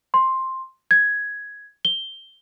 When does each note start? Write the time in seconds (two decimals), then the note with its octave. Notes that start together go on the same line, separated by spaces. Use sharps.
0.14 C6
0.91 G#6
1.85 G7